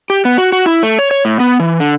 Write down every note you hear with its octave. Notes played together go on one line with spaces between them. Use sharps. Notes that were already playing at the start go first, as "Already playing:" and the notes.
G4
B3
F#4
F#4
E4
A3
C#5
C#5
A2
B3
E3
D3